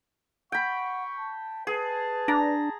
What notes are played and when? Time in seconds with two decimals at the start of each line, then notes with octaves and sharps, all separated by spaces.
0.52 F#5 G5 B5 C#6
1.18 A5
1.67 G#4 B4 A5
2.28 D4 A#5